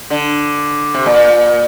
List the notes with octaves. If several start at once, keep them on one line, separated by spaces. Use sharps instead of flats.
D3
C3
A#2